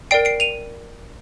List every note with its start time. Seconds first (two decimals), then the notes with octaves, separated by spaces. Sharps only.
0.11 A#4 D5 G5 C7 D7
0.25 C7 D7
0.40 D#7 F7